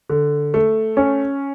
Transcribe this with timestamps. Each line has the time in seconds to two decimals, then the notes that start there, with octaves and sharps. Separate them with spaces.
0.09 D3
0.54 A3
0.97 C#4